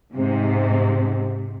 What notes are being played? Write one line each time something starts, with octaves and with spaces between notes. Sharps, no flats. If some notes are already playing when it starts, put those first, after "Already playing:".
G#2 C3